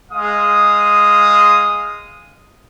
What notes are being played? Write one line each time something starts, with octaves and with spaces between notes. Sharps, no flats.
G#3 F5 D#6